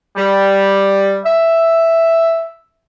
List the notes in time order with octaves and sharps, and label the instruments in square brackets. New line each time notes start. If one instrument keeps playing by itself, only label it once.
[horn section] G3
E5